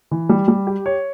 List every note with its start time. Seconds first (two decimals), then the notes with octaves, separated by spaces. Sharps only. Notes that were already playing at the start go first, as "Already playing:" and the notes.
0.11 E3
0.29 G3
0.48 G3
0.67 G4
0.86 C#5